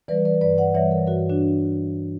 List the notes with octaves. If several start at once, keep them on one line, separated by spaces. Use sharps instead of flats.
E3 G3 B4 D5
B4 D5
G2 B4 D5
D5 F#5
E3 G3 C#5 E5
A#4 C#5
G2 F#4 A#4
D4 F#4